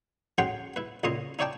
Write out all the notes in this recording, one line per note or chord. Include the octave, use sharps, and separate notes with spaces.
G#2 F#3 C#4 F#5 G5 C6
E4 B4
C#2 A#2 C#4 E4 D#5 C6
D#4 E4 C#5 D5 G5 A5